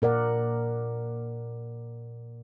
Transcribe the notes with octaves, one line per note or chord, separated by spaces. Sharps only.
A#2 A#4 D5 F#5